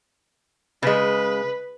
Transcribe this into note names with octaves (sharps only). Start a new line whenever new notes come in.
C#3 G#3 B4